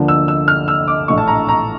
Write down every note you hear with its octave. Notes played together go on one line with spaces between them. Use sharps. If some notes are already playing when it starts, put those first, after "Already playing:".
Already playing: D2 D3 F3 A#3 D4
E6
E6
F6
E6
D6
A#1 A2 E3 A3 D4 C#6
A5
A#5
A#5